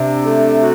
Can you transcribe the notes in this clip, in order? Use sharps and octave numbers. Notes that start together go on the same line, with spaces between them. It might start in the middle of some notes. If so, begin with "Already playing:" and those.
Already playing: C3 D4
A3
F#4